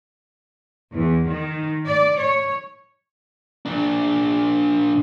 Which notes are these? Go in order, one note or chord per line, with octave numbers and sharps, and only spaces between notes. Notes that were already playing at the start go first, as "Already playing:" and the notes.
E2
D#3
D5
C#5
A#2 D4